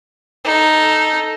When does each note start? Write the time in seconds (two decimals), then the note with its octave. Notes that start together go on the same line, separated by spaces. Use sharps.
0.45 D#4 A4